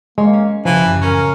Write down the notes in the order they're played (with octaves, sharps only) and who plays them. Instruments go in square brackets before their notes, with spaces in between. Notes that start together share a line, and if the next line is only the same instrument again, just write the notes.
[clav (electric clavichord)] G#3 [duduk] A#3 [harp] C#5 C6
[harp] C#4
[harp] A1 C#3 C6 [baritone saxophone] E3 [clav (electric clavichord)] F3 [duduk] B4
[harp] A1 F#2
[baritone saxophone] C#4 [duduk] A#4 [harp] F5 A#5